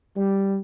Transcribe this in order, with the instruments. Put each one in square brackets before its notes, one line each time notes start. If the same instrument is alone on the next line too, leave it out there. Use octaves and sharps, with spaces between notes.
[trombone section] G3